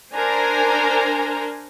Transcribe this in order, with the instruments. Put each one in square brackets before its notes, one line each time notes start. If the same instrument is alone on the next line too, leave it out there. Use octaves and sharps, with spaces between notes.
[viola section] D4 A#4 C5 G#5 A#5